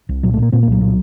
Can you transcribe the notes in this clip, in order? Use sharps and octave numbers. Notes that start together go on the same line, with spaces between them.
C2
A#2 F#3
A3
A#2 A#3
A#2 C4
A#3
C2 F#3
A#2